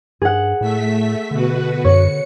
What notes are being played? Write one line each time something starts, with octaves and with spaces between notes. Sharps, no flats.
G2 G#4 F#5
A2 A3 E5 B6
B2 D3 F#4 B4
F#2 C#5 C#7